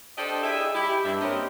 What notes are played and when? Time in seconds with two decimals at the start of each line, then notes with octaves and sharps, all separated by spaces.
0.18 D4 G4 A4 C5 D5 D#5
0.44 E4 G4 G#4 D#5 E5
0.75 E4 G4
1.05 G2 D4 E5
1.21 A#3 C4 C#4 G4 D#5